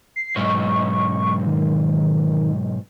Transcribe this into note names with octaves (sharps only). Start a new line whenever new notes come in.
C7
B1 G#2 C#6
D#3